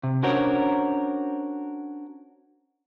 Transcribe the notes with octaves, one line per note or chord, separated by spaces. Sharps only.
C3
C#4 D4 F#4 A#4 C5 C#5